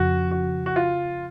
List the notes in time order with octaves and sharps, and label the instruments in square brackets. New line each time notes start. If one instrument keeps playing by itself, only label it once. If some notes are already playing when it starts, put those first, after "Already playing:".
Already playing: [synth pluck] F2 C#3 F3 [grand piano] F#4
[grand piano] F#4
F#4
F4